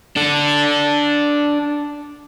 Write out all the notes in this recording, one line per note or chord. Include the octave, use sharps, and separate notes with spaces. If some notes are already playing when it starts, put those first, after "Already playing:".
D4 A4